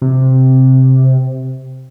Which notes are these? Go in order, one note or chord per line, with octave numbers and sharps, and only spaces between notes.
C3